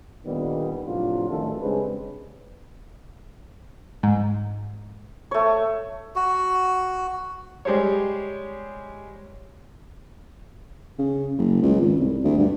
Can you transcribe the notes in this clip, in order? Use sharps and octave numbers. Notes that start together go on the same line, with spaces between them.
A#2 D3 D#3 G3 B3
A2 C3 F3 F#3 D4 F4
A1 D2 D#3 G3 A3 A4
C#3 G3 G#3 C4 D4 B4
G#2
A3 C#5
F#4
G3 G#3 G4 C5 C#5
C#3
F#1
C#2
G#1
C2
D2
G2